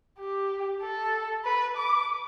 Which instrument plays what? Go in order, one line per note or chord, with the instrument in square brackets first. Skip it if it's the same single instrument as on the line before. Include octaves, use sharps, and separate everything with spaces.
[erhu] G4
A4
B4
D6